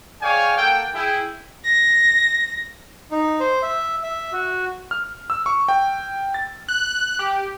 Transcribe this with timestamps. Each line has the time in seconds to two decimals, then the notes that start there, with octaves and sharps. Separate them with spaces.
0.22 G#4 C#5 D5 F5 G5 G#5
0.58 A#3 A4 F#5 G5
0.93 E4 G#4 G5
1.63 A#6
3.11 D#4
3.40 C5
3.62 E5
4.03 E5
4.33 F#4
4.91 F6
5.30 E6
5.46 C#6
5.68 G5
6.34 A6
6.69 F#6
7.19 G4